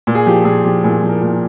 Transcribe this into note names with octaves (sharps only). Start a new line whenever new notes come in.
A#2
G#4
F3 G4
A#2 G#4
F3 G4
A#2 G#4
F3
A#4
A#2